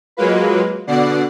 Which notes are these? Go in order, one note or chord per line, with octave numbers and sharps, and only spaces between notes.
F#3 G#3 A#3 F4 B4
B2 D3 D5 F#5 C7